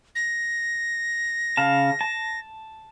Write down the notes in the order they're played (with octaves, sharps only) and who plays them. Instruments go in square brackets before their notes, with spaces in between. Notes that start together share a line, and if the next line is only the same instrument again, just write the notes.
[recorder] A#6
[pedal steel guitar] C#3 F5 A5
A5